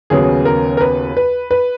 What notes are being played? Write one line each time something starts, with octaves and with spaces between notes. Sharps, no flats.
D#2 C#3 F#3 B3 G#4
A#4
A#4
B4
B4
B4